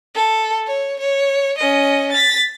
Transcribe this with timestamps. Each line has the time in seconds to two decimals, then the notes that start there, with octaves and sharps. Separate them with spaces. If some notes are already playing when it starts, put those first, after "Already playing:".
0.15 A4
0.67 C#5
1.00 C#5
1.58 C#4 D#5
2.12 A6 B6